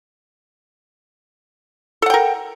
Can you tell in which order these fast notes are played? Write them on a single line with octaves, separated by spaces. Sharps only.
A4 F#5 G5 A#4